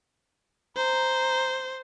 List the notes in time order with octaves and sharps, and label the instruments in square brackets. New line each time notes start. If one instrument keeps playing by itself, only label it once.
[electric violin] C5 [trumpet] A#5